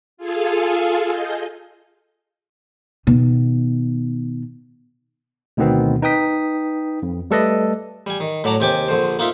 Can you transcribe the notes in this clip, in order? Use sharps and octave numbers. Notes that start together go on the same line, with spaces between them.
F4 G#4 A4 F5 G#5
D#5 G6
B2 D#3
D2 B2 D#3 B3 C4
D#4 B4 G5 D#6 B6
F2
G3 A3 A4 B4 D5 D#5
G3 G#5
D#3
A2 F#3 D5 A5 A#5
D#2 C3 G5 G#5 D6
A#1 D3 C5
A#3 D#4 F4 E5